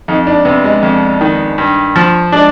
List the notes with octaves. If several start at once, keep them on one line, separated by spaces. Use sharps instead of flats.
F2 D#4
D4
C3 B3
G#3
F2
D#3
G2
F3
G#3 D4